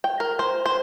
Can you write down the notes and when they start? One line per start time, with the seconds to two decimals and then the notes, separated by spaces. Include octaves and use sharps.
0.04 G5
0.20 A#4
0.39 C5
0.66 C5